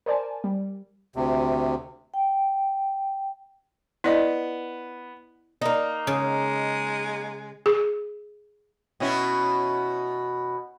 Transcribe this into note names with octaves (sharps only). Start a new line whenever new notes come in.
A#4 C5 D5 G#5 A5
G3
D2 C3
G5
B3 E4 D5 D#5
A#3 D#4
C#3 G#3
G#4
B2 C#4 E4